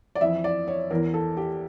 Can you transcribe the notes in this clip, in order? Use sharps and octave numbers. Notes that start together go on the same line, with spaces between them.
D5
F2 E3 E5
D5
C#5
E2 E3 A#4
A4
G4